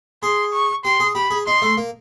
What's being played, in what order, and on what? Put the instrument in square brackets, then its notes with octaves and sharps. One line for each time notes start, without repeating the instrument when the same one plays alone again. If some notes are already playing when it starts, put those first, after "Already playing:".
[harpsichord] G#4 [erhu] C6
[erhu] C#6
[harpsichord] G4 [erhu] C6
[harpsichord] G#4
[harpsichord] G4 [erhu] B5
[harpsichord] G#4
[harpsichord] D#4 [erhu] C6
[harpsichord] A3
A#3